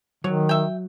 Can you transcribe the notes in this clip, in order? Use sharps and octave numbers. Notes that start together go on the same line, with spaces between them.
D#3 F#3 C#5
E5 G5